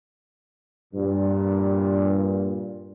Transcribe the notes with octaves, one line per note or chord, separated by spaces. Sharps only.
G2 A#2